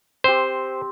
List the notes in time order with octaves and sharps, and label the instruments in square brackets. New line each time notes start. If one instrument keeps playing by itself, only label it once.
[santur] C4 G4 [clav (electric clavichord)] C5